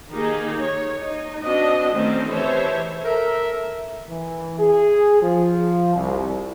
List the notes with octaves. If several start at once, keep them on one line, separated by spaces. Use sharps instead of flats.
D#3 A#3 D#4 G4 G#4
C#5
D#4
C4 D4 F#4 D#5
D#3 A3 C4 C#4
E3 G4 A4 C5 C#5 E5
A4 A#4 E5
E3
G#4
F3
C2